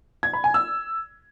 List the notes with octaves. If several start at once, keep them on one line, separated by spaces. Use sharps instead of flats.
G#6
B5
G#5
E6